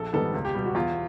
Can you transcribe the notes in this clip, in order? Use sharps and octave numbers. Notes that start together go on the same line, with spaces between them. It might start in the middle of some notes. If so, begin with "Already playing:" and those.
Already playing: A#1 A4
G#2 D#3 G3 B3 A4
C#2
G4
B2 G3
F#4
E2 F4